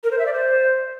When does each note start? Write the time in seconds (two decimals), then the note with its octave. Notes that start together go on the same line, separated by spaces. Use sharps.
0.04 A#4
0.11 C5
0.19 E5
0.26 D5
0.33 C5